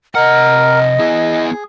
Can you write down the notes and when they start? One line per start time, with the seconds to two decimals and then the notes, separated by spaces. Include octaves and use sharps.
0.15 C3 A#4 D#5 F#5
0.99 B3 E4 G#4